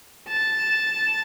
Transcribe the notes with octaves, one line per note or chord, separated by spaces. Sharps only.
A5